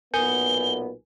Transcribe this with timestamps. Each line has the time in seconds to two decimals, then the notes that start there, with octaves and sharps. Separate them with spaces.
0.14 B1 A#2 B3 A#4 G#5 G6 G7